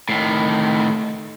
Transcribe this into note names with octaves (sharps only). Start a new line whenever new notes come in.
A2 D#3